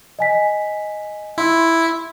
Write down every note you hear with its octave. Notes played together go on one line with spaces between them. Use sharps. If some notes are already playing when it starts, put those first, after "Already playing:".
D#5 G#5 B6
E4 C6